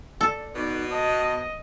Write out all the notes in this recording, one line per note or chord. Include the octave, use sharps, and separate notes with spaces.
A4 D5
B2 B3 D#4 D5
D#5 A5